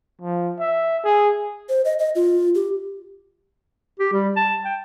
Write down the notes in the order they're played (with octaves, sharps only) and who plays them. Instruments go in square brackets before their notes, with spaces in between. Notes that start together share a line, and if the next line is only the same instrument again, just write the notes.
[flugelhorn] F3
E5
G#4
[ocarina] C5
D#5
D#5
F4
G4
[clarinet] G4
G3
A5
G5